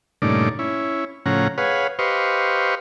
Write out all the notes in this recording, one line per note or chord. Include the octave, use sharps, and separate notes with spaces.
G2 A#2 C#3 A3 D#4 D5
C#4 E4
A2 C#3 F3 C#4 F#5 A#5
G#4 B4 C#5 F5 F#5
G4 B4 C5 D#5 F5 C#6